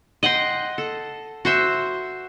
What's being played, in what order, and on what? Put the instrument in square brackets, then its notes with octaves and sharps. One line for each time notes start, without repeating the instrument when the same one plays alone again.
[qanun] D#5 F#5 G5 C6
A4
F#4 C5 E5